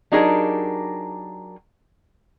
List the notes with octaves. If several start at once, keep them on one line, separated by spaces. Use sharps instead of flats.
F#3 D4 D#4 G4 G#4 A#4